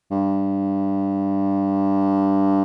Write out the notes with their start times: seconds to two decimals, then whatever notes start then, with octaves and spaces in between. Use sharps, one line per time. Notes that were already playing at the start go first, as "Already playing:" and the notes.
0.11 G2